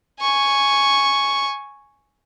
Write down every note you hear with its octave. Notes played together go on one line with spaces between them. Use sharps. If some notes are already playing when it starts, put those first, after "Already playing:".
G#5 C#6